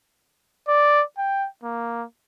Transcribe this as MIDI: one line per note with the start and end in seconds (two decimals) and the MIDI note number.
0.68 1.02 74
1.18 1.48 79
1.63 2.04 58